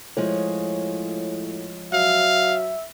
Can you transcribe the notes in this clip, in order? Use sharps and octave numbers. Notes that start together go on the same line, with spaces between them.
A2 F3 G#3 C#5
F#3 E5 F5